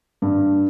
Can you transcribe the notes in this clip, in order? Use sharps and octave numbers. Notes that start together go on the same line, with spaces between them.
G2